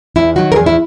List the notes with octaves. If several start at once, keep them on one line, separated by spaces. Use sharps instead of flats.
E2 E4
D#3 F#3 F#4
A#4
E2 G#4
E4